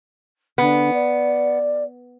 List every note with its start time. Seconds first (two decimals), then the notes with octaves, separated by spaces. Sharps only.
0.58 D3 B3
0.93 D5